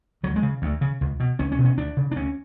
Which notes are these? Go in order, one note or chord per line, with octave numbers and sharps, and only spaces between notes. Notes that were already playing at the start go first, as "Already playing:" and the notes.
D2 F#3
G#3
C#3
D2
C#3
C#2
B2
C#2 C#4
C#4
B2
C#4
D2 D4
C#3
D4
D2 C#4